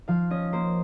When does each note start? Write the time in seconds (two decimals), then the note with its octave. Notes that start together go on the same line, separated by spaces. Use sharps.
0.08 F3 F5
0.31 C#4 D#5
0.53 A#3 C5